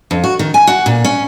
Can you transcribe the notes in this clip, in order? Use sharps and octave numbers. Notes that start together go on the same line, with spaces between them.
F2
F#4
D#3
G#5
F#4
A#2
C#4